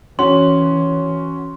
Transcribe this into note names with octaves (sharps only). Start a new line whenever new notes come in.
E3 C#4 F#4 C6